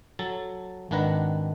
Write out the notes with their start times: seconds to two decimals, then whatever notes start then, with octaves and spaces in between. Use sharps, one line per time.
0.19 F#3 A4 A5
0.91 G#1 D#3 D4 B4 F#5 A#5